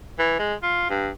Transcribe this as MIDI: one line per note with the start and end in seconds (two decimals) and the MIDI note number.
0.19 0.37 52
0.39 0.54 56
0.63 0.88 65
0.90 1.09 43